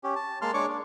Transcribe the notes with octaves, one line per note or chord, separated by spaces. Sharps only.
C#4 G4
A5
G#3 A#3 A5 C6 F6
G#3 D4 C#5 C#6 D6
D4